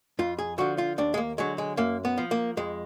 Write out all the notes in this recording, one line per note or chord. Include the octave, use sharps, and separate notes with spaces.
F2 F4
G#4
D3 F3 F#4
F4
D#2 D4
G#3
A#3
D3 F#3 G#3
G#3
F#2 A#3
B3
F3
A#3
F2 G#3